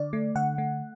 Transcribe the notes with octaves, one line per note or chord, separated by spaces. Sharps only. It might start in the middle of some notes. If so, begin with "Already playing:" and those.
Already playing: D3 D5
A3
D3 F#5
A3